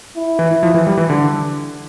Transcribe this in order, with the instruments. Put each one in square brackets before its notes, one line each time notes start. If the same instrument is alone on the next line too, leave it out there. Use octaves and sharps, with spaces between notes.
[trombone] E4
[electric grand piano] E3
F3
E3
G3
E3
D3